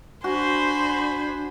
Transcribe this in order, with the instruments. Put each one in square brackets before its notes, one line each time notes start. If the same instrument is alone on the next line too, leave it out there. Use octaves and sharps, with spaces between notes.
[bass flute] D4 [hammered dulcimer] F#4 [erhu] C5 [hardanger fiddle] G#5 B5